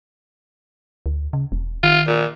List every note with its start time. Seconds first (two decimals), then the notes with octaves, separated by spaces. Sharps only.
1.06 D2
1.33 C#3
1.52 E1
1.83 D#3 F4
2.07 A#2